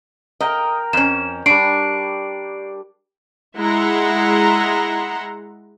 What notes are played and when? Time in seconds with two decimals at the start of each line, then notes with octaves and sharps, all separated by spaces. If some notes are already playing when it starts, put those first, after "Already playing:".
0.40 A#4 D#5 G5 A#5
0.93 F2 C#4 E7
1.46 G3 D4 D5 C#6 C7 D7
3.57 G#3 E4 E5 F#5 A#5 C6